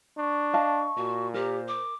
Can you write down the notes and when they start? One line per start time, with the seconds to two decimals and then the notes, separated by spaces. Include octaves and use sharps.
0.18 D4 C#6
0.53 D#5 F5 A5
0.97 A#2 F#4
1.34 G4 A#4 C5
1.68 D6